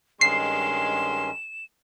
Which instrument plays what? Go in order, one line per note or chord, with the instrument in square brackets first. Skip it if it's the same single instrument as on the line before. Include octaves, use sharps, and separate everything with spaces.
[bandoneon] G2 D#3 C#4 [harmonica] G#3 C6 [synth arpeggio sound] C7 [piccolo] E7